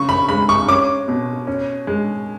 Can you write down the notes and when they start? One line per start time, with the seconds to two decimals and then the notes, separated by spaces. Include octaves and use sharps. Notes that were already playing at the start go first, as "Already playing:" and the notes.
Already playing: C#3 C#6
0.09 B5
0.29 G#3 B5
0.49 C#6
0.68 C#4 D6
1.08 B2
1.47 C#4
1.87 G#3